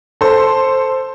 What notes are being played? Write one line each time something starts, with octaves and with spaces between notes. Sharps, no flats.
A4 C5